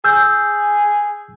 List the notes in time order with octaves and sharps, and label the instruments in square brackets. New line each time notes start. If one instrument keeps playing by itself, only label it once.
[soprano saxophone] G#4 [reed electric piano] E6 G6